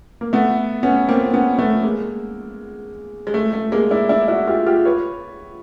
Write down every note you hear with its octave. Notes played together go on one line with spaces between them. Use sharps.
A#3
A3 B3
B3 C#4
A#3 C4
B3 C#4
A3 B3
G#3 A#3
G#3
A3
A3
G#3 A#3
D4 E4
D4 E4
E4 F#4
F4 G4
F4 G4
B4 C#5